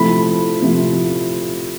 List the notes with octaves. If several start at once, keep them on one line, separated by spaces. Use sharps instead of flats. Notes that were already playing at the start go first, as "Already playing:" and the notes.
Already playing: C3 F3 A3 C4 E4 B5
C3 F3 A3 C4 E4